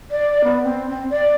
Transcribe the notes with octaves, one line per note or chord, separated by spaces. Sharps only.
D5
B3
C4
C4
D5